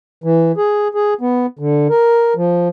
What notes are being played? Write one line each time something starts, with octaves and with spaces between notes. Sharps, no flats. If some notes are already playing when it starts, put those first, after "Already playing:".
E3
G#4
G#4
B3
D3
A#4
F3